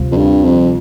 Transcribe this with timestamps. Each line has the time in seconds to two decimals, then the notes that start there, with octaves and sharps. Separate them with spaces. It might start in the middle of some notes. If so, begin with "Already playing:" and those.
Already playing: D2 C3 G3 C4 F4
0.12 F2
0.17 G2
0.44 F2